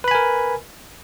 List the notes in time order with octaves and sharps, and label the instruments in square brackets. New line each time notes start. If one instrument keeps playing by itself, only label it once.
[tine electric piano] B4
B5
G#5
A#4